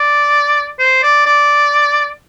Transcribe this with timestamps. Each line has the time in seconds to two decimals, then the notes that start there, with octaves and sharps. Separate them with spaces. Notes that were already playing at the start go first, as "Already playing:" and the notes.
Already playing: D5
0.79 C5
1.03 D5
1.26 D5